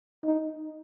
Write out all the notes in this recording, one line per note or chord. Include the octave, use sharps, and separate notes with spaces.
D#4